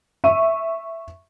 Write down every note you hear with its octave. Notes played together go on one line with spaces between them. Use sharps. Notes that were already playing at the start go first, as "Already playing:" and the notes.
E5 C#6 D#7